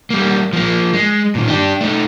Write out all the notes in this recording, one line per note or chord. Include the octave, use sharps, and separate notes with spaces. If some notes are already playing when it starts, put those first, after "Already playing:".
G3 A#3
F3 A#3
G#3
A#2 D#3
D4 G4
A3 D#4